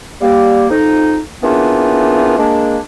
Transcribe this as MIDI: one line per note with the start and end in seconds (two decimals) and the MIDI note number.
0.21 0.65 55
0.21 0.65 58
0.69 1.20 41
0.69 1.20 63
1.43 2.35 49
1.43 2.35 52
1.43 2.35 58
1.43 2.35 59
1.43 2.35 62
1.43 2.35 65
2.37 2.77 56
2.37 2.77 58
2.37 2.77 62